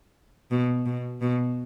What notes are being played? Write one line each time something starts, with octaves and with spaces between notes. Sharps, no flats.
B2
B2
B2